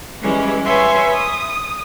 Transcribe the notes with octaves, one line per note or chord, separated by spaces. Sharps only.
E3 G3 G#3 C#4 E4
B4 C#5 E5 G#5 C6
D#6